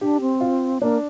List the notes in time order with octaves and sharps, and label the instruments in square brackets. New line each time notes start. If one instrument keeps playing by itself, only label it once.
[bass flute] D4 [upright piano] G4
[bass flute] C4
[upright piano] F4
[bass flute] A#3 [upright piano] D4